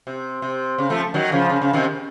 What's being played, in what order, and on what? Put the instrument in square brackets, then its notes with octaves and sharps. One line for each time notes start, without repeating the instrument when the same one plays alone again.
[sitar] C3
C3
C#3
F3 A3
D#3 F#3
C#3 F3
C#3
C#3
C3 D#3